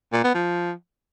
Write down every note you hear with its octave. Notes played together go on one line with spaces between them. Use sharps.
A#2
B3
F3